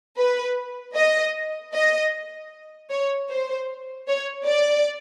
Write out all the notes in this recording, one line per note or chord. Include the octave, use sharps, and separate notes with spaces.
B4
D#5
D#5
C#5
C5
C#5
D5